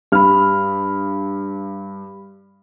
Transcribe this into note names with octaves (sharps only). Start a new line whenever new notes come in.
G2 G4 B5 F6